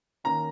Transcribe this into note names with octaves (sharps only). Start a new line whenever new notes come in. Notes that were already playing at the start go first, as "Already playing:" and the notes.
D#3 A#3 C#4 A#5